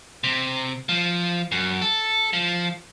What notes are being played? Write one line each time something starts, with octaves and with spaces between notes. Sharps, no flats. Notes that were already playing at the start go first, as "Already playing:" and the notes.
C3
F3
F#2
A4
F3